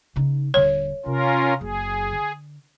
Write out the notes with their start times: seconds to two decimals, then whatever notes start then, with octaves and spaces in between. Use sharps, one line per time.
0.16 C#3 D#4
0.54 D#1 D3 C#5
1.06 C3 C#4 F4 A#4
1.61 F#1 G#4
2.12 D3